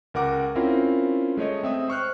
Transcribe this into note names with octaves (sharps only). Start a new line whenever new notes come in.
C#2 A#4 F#5 D6
C4 C#4 E4 F4 A#4
G#3 A3 C#5 D#5
C4 E5 D#6
C5 C#6 F6 F#6